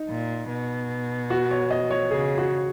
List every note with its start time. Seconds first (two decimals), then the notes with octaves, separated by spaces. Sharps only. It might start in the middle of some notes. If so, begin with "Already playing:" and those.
Already playing: D#4
0.09 A#2
0.49 B2
1.30 F#4
1.51 C#5
1.71 D#5
1.91 C#5
2.11 C#3 G#4
2.38 F#4